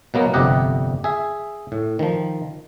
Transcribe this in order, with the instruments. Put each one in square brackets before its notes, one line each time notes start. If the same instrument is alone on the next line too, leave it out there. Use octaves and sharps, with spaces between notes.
[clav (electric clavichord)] B2 F#3 A#3 B3
G1 F2 C3 G4 D#5 F#5
G#4 E5
A2
D#3 F3